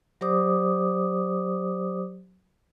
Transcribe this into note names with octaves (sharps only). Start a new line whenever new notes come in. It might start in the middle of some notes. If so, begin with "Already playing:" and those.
F#3 G4 C5 D5 D6 D#6